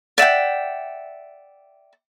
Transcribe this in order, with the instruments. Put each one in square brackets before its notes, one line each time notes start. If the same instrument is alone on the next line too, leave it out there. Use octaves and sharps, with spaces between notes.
[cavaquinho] D5 E5 F#5 G5